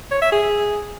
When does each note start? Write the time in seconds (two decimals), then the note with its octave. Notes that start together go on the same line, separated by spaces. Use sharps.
0.11 C#5
0.22 E5
0.32 G#4